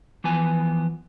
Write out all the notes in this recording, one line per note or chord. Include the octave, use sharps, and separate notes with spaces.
E3 F3 B3 G#5